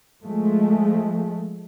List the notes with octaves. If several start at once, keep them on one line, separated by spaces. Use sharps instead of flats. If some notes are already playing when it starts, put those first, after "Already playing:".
F3 G#3 A3